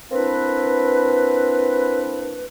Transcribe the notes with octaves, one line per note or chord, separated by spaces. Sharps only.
A#3 C4 D4 E4 B4